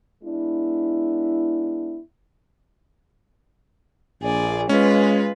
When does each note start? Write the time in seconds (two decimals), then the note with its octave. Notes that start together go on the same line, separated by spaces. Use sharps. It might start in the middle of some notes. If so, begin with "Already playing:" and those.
0.23 G#3 B3 D4 E4
4.22 A#1 G#4 D5
4.69 G#3 C#4 F4 B4